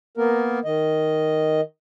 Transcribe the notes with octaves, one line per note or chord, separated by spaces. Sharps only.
A#3 B3 A#4
D#3 D#5